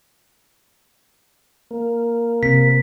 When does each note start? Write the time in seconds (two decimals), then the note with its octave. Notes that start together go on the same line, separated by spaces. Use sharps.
1.71 A#3
2.43 C3 B6